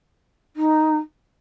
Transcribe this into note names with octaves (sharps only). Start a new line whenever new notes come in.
D#4